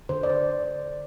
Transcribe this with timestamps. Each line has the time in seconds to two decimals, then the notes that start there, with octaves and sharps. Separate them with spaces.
0.09 D3 C5
0.23 D5
0.29 C5